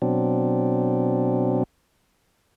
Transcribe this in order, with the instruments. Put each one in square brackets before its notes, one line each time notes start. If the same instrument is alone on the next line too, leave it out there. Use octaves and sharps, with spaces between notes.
[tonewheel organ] B2 F#3 C4 D4